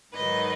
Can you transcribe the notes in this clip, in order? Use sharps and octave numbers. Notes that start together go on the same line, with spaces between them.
G#2 D#3 F#3 B4 D#5